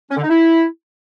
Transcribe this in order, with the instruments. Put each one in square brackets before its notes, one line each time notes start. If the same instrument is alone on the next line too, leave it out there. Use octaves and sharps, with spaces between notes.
[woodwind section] C#4
D3
D#4
E4